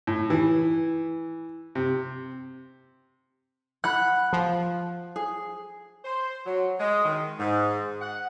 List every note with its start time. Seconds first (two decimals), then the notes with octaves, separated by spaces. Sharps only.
0.07 A2
0.30 E3
1.75 C3
3.84 F#5 B5 F#6
4.33 F3
5.16 G#4
6.05 C5
6.46 F#3
6.80 G#3
7.05 D#3
7.40 G#2
8.02 F#5